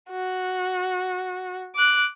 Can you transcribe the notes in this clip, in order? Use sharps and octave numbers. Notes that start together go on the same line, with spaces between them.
F#4
D6 F#6